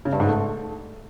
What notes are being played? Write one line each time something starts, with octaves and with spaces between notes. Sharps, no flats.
C#3
G2
G#2
A3